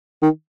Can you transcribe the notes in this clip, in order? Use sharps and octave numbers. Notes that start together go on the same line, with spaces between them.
D#3